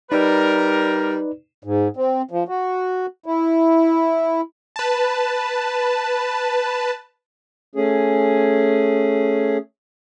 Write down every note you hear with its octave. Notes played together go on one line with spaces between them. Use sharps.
G3 D#4 A#4 B4 D5
G#2
C4
F3
F#4
E4
B4 A5
A3 C#4 G#4